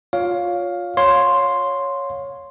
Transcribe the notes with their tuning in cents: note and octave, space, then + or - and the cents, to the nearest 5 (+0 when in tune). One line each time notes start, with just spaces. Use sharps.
F4 +15 C#5 +20 F5 +10
C#5 +0 F5 +25 C6 +0